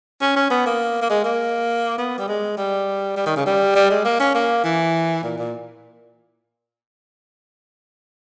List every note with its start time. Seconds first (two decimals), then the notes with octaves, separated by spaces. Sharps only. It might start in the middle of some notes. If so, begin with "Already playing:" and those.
0.22 C#4
0.36 C#4
0.51 B3
0.66 A#3
1.02 A#3
1.10 G#3
1.24 A#3
1.98 B3
2.18 G3
2.28 G#3
2.57 G3
3.16 G3
3.26 D#3
3.36 C#3
3.46 G3
3.76 G3
3.90 G#3
4.05 A#3
4.20 C#4
4.35 A#3
4.64 E3
5.23 A#2
5.38 A#2